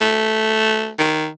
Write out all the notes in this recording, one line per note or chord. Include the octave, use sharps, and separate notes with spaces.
A3
D#3